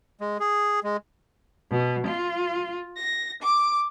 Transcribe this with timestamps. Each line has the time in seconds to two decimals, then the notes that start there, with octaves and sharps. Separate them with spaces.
0.21 G#3
0.40 G#4
0.84 G#3
1.70 B2
2.07 F4
2.97 A#6
3.43 D6